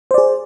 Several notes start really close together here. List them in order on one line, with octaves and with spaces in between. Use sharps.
C5 D5 G#4